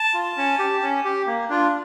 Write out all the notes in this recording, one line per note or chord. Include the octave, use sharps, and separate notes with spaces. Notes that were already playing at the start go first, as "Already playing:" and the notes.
Already playing: A5
F4
C#4
G4
C#4
G4
A#3
D4 F4